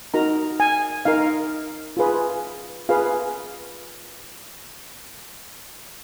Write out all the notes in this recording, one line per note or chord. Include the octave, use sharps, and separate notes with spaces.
D#4 F#4 A#4 A#5
G#5
D#4 A#4 F5
F4 G#4 B4
F4 G#4 B4 F5